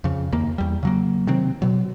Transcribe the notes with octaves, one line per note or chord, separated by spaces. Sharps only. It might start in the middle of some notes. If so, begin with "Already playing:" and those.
F2 C#3
D#2 A#3
E2 G3
C#3 F#3 A#3
C3 D#3 F#3 C4
B2 F#3